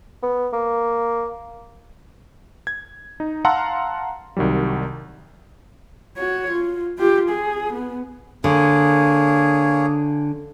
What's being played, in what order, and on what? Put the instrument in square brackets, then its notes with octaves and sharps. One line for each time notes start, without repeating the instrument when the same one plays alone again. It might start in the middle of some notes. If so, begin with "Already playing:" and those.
[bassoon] B3
A#3
[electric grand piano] G#6
D#4
F5 F#5 A5 A#5 C6 E6
C2 D#3 F#3 G3
[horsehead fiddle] F#4 C#5
F4
F4 G4
G#4
B3
[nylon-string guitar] D3 [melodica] A#3 G#4 C#5